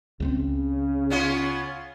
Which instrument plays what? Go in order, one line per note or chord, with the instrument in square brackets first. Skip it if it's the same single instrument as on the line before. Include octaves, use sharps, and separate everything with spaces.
[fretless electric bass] C#2 G3 C4 [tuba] C#3
[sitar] B3 C#4 F4